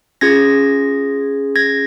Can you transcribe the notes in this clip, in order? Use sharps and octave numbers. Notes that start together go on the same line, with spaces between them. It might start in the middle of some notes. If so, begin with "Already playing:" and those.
C#4 F4 G#4 G#6 A#6
G#6 A#6